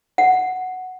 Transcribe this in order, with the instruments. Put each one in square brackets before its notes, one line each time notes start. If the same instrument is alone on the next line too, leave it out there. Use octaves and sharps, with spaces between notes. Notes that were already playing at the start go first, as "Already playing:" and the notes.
[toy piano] F#5